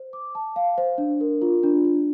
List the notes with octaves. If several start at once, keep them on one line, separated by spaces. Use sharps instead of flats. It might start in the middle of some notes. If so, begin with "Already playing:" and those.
Already playing: C5
D6
A5
F5
C5
D4
A#4
F4
D4
D4